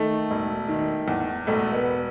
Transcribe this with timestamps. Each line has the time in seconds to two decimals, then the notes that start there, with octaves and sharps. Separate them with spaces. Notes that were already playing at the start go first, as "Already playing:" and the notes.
Already playing: D#3 A3
0.30 E1
0.68 D#3
1.08 E2
1.47 E1 A3
1.73 B3